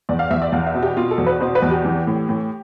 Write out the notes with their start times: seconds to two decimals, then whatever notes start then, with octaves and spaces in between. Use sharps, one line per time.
0.09 E2 D5
0.19 F5
0.31 E2 E5
0.42 D5
0.52 E2 F5
0.67 E5
0.74 B2
0.83 G4
0.97 B2 F4
1.11 A4
1.18 E2
1.26 B4
1.40 B2 C5
1.55 B4
1.62 E2
1.71 G4
1.85 E3
2.07 A2
2.29 A2